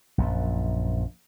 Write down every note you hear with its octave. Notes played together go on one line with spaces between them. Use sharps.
A#1 F#2 A#2